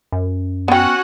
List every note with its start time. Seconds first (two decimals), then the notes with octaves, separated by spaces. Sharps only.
0.12 F#2
0.68 B3 C#4 F#4 F#5 G5